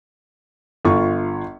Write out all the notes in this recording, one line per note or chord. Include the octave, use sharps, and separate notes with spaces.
G1 F4 C#6